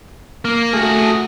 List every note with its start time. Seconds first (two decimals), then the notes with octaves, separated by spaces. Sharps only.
0.45 A#3
0.73 A3 F#4 G#4